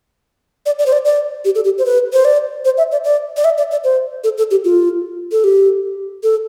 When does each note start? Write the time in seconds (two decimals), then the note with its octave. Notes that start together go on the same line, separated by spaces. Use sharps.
0.66 D5
0.79 D5
0.86 C5
0.93 D5
1.05 D5
1.45 G4
1.55 A4
1.64 G4
1.78 C5
1.86 B4
2.13 C5
2.25 D5
2.65 C5
2.78 E5
2.92 D5
3.04 D5
3.37 D5
3.45 E5
3.58 D5
3.71 D5
3.84 C5
4.24 A4
4.38 A4
4.51 G4
4.65 F4
5.32 A4
5.44 G4
6.23 A4